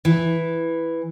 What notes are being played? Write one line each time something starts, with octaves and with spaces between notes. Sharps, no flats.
E3